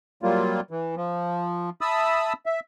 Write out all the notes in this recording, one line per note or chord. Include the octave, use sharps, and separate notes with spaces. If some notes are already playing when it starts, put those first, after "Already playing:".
F#3 G3 A#3 F4
E3
F3
E5 A5 B5 D#6 E6
E5